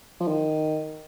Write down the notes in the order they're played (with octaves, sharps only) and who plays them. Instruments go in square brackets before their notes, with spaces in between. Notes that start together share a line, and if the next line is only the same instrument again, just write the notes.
[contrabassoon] F3
D#3